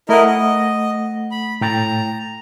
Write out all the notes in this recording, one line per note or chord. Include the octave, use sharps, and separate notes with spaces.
A3 E4 A#4 D#5 F#5
D#5
B5
A2 G5 A#5 A6